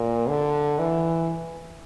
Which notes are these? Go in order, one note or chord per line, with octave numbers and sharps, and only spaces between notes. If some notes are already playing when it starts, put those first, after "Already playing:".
Already playing: A#2
D3
E3